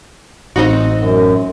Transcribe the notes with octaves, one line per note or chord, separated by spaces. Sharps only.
A1 C4 D#4 F#4
F#2